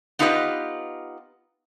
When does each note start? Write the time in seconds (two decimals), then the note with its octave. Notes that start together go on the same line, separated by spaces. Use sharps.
0.19 B3 D#4 F4 G4 B4 D#5